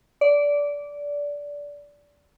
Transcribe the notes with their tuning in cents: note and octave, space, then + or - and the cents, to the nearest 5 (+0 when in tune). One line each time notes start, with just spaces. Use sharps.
D5 -20